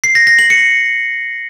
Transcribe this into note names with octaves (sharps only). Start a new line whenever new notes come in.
C7
A#6
A#6
F#7
C#7